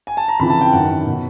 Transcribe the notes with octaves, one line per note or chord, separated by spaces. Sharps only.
G#5
A5
A#5
F2 C#3 E3 B5
A5
G5
F#2 D#3 F#5
B2